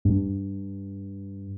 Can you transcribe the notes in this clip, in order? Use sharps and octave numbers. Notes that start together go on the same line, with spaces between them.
G2